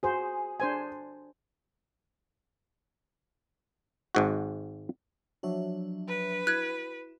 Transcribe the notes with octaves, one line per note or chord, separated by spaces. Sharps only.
F#4 G#4 C5
D4 C5 G#5
G#1 G#2 F#4
F3 F#3 D4 F#4 C#5 E5
B4
E4 F#4 F#6 G#6